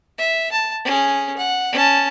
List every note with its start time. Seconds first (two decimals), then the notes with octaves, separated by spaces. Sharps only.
0.18 E5
0.52 A5
0.85 C#4 G#4
1.37 F#5
1.72 C#4 A5